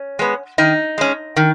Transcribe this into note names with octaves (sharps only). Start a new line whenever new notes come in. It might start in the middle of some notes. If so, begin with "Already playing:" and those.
Already playing: C#4
G#3 B3
D#3 D#4
G#3 C#4
D#3